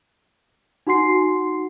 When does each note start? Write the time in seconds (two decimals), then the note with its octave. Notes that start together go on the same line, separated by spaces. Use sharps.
0.87 D#4 F#4 F#5 C6 C7